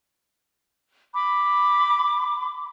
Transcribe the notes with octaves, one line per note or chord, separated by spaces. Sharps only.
B5 D6